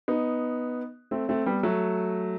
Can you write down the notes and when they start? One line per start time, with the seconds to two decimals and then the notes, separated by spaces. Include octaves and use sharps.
0.08 B3 D#4
1.11 A3 C4
1.29 A3 C4
1.46 G3 B3
1.63 F#3 A3